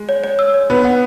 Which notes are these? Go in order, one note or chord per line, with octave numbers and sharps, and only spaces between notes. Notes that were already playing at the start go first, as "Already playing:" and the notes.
Already playing: G#3
C#5
C#5
E6
C#5
B3 B4
F#5